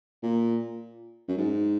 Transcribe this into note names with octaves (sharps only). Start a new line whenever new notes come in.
A#2
F#2
G#2